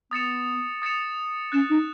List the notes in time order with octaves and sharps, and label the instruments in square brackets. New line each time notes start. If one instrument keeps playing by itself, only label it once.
[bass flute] B3 [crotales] D#6 A6 C#7 E7
[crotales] D#6 A6 C#7 E7
[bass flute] C#4 [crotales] F#6 A6 E7
[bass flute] D#4